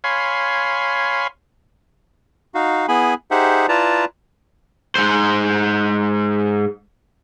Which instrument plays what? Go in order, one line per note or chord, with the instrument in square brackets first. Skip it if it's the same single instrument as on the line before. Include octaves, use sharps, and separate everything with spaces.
[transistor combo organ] C#5 F5 G#5 B5 C6
[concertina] D#4 F#4 F5
B3 E4 G#4 G#5 B5
D#4 G4 G#4 C5 E5 F#5
E4 F4 B4 D5 A5 A#5
[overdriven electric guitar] G#2 C5